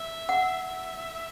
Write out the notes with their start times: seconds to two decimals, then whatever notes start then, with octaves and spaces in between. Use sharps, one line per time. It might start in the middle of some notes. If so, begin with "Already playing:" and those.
Already playing: E5
0.29 F#5
0.67 E5